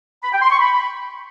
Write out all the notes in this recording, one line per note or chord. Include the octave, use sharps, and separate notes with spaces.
B5
G5
C6
C#6
B5